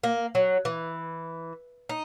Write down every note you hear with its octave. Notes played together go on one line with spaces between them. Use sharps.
A#3
F#3
E3
D#4